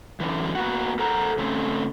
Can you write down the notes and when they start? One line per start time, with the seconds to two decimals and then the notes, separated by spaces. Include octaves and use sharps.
0.20 F#2 D3 E3
0.55 A#3 B3 F#4 F#5
0.99 A4 A#4 C5 F#5 A#5
1.38 C#3 A3 C4